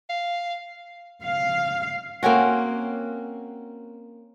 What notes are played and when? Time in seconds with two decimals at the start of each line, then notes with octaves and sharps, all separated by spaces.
0.10 F5
1.23 F5
2.23 A#3 C4 C#4 F#4